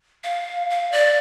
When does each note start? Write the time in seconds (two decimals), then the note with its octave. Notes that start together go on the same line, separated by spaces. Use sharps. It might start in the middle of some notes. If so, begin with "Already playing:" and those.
0.24 F5
0.70 F5
0.92 D5